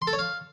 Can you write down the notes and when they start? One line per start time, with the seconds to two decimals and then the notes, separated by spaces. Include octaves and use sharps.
0.02 C6
0.07 A4
0.13 C#5
0.19 F5